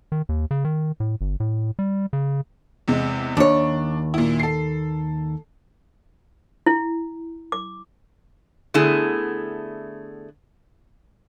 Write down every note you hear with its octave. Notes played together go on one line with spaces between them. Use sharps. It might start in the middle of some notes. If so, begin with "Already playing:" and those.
D#3
D#2
C#3
D#3
A2
G1
A2
G3
C#3
E2 C3 G#3
D#2 D4 C#5
A#2 E4
A4 C7
E4
D6
D3 A3 B3 E4 G#4